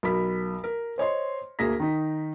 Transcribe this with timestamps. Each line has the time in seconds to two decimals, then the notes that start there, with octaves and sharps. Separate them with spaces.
0.03 B1 A#4 B5 B6
0.64 A#4
0.98 C5 C#5 D#5 C6
1.59 D2 A#3 G#4 A#6 B6
1.80 D#3 D#4